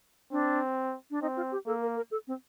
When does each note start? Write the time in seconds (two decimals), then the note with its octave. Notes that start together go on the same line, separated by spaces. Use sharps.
0.31 C4 D4
1.11 D4
1.22 C4 D#4
1.37 F4
1.51 G4
1.67 A#3 A4
1.82 A#4
1.97 A#4
2.11 A4
2.27 C4